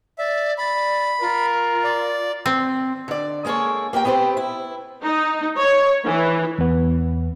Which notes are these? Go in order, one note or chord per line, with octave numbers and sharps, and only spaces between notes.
D5 E5
D5 B5
F4 A#4
D5
C4
D3 D5
G#3 A#3 G#4 A4 C#5
A#3 G4 A#4 G5
B3 C4 G4 B4 C5
E4
D#4
C#5
E3
E2 B3